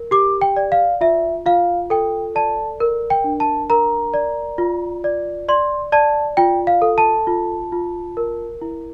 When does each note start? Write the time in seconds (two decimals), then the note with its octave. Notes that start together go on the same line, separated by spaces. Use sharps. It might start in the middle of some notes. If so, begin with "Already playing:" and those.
Already playing: A#4
0.11 G4 D6
0.41 G5
0.57 D5
0.72 F5
1.01 F4 E5
1.46 F4 F5
1.90 A4 G5
2.35 D5 A5
2.80 A#4
3.10 G5
3.24 D4
3.40 A5
3.70 A#4 A#5
4.14 D5
4.58 F4
5.04 D5
5.49 D5 C6
5.92 D5 A5
6.37 F4 G5
6.67 F5
6.82 A4
6.98 A5
7.27 F4
7.72 F4
8.17 A#4
8.62 E4